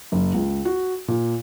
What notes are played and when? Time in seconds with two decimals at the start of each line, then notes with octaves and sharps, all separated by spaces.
0.12 F#1
0.35 C#2
0.65 F#4
1.08 A#2